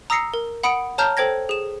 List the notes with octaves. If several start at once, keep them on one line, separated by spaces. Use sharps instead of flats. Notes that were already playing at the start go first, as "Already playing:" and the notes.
A#5 D#6 E6 A#6 C7 C#7
A#4
F#5 B5 D#6 C#7 D7
C#5 A5 A#5 F6 G6
A4 C5 G5 G#6 A#6
G#4 E7